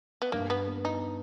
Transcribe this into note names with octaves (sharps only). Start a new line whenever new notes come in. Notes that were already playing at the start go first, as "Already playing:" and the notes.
B3
G2 A#3
B3
B3
D#4